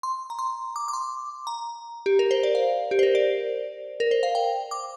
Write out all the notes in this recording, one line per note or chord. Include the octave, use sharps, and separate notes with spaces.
C6
A#5
C6
D6
D6
C6
A#5
G4
A#4
C5
D5
F5
G4
C5
A#4
D5
A#4
C5
F5
G5
D6